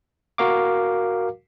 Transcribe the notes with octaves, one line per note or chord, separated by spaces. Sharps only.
F#4 A#4 F5 D6